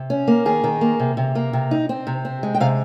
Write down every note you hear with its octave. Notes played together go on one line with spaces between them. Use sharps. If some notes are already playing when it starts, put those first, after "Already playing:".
Already playing: C3
C#4
A#3
D#3 G#4
D#3
A#3
C3
C3
A#3
C3
D#4
C4
C3
C4
G#3
G5
C3 F5